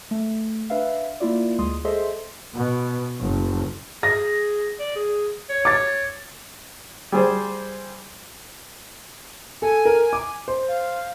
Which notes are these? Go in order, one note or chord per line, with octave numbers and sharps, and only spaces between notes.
A3
D4 B4 E5 F5
A#3 E4 F4 D5
D2 G#3 C6 D#6
G#4 A4 C5 D#5 E5 C6
B2
F#1
G#4 A#6
D5
G#4
C#5
D6 A6
G3 G#4 C5
A4 G#5
A#4
D6
C5
F5